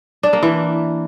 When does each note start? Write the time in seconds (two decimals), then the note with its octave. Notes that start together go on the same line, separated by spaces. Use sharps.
0.23 D4
0.33 A#3
0.43 E3